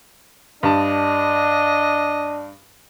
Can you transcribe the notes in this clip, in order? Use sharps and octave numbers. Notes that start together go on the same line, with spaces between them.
G2 D4 D#5 A5